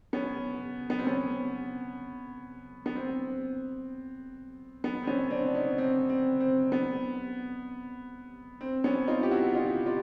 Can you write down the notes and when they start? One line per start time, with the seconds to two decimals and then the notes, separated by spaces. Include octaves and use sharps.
0.13 B3 C#4
0.90 B3
0.99 C4
1.07 B3 C#4
2.86 B3
2.96 C4
4.84 B3
5.03 C4
5.07 B3 C#4
5.31 C4 D4
5.46 D4
5.55 C#4 D#4
5.78 C4 D4
6.10 C4
6.40 C4
6.72 B3
8.61 C4
8.84 B3 C#4
9.07 D#4 F4
9.23 G4
9.31 E4 F#4
9.55 D#4 F4
9.86 F4 G4